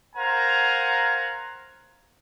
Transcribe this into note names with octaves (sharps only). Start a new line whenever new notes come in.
A#4 C5 F5 F#5 G#5 A#5